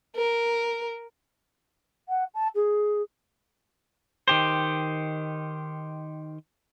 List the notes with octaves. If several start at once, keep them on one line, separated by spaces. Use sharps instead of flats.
A#4
F#5
A5
G#4
D#3 G4 C5